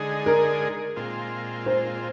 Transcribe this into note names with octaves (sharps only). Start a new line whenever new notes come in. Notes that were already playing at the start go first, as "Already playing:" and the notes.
Already playing: D3 G#3 D#4 G#4
A#4
A#2 G#3 C4 F4
C5